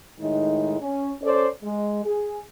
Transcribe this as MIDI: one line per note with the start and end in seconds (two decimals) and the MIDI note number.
0.18 0.76 45
0.18 0.76 51
0.18 0.76 56
0.18 0.76 63
0.80 1.11 61
1.22 1.47 61
1.22 1.47 69
1.22 1.47 72
1.22 1.47 74
1.63 2.01 56
2.04 2.38 68